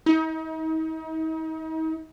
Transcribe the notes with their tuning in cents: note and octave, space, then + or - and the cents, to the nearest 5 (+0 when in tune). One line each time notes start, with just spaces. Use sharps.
D#4 +40